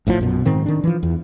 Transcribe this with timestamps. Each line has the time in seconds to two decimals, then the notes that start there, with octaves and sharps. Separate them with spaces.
0.07 A#1 A2 C3 F3
0.19 A#1 F#2 B2
0.45 G#2 D#3 C4
0.66 D#3 D4
0.84 E3 F3
1.03 E2